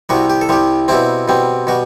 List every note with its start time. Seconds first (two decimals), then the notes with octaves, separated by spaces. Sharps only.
0.09 C2 C3 G3 F#4
0.30 G4
0.41 A4
0.49 C2 C3 G3 G4
0.88 B2 G3 C4 E4
1.28 B2 G3 C4
1.67 B2 G3 F#4